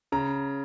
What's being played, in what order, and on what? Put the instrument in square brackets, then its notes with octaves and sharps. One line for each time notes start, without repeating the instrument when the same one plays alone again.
[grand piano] C#3 A#5